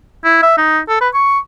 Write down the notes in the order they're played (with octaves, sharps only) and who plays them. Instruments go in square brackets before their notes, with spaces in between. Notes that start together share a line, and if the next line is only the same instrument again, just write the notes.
[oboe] E4
E5
D#4
A4
B4
C#6